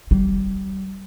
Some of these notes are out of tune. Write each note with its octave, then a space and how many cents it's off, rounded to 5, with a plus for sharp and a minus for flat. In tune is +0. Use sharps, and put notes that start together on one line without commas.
G3 -25